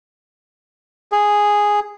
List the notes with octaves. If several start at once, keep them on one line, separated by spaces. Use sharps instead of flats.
G#4